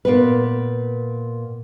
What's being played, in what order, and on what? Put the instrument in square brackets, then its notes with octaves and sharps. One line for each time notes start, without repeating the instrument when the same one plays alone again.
[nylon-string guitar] A#2 B3 B4